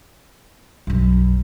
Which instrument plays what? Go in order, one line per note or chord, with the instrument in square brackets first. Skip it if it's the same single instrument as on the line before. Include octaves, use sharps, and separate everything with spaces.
[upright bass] B1 F#2